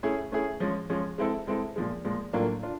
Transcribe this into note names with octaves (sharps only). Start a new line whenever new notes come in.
A3 C#4 E4 G#4
A3 C#4 E4 G#4
F3 G#3 C#4
F3 G#3 C#4
G#3 C4 E4 A4
G#3 C4 E4 A4
A#2 F3 G#3
A#2 F3 G#3
A2 F#3 A#3 D4 F4
D4 F4